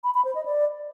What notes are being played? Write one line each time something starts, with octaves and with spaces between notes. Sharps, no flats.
B5
B5
C5
D#5
D5